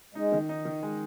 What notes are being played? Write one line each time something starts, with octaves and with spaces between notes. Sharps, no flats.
G#3 D#4
D#3
D#4
D#3
G#3